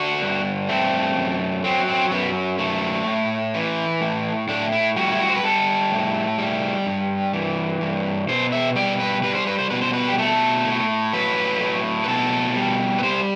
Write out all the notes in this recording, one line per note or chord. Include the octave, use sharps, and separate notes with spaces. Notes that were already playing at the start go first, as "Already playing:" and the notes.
Already playing: D3 F#4
G2
A3 C4
F#2
F#3 C4
C4
F#2 B3
A3
A2
E3
A2
A2 D4
E4
G3 F#4
E4
F#4
C5
B4
G3 A4
A2
G3
G2
E3
G2
B2 C5
E5
G3 D5
B4
G3 B4
C5
B4
C5
B2 B4
C5
B4
G4
A3 A4
A2
F#3 B4
A2
B4
B2 A4
G3
B4
G3 C5